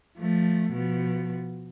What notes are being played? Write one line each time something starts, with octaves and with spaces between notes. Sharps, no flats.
F3 A3
B2 F3